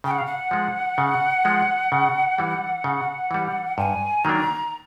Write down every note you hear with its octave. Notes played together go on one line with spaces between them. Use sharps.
C#3 G5
F#5
F5
F#5
F3 G#3
C#3
F3 G#3
C#3
E3 G3
C#3
E3 G3
G2 G#5
D#3 F#3 A#3 D4 A#5